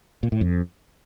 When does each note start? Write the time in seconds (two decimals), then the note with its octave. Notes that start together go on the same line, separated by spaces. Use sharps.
0.23 A#2
0.32 A2
0.41 F2